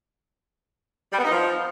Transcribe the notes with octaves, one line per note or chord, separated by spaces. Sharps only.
G3
B3
D#4
F3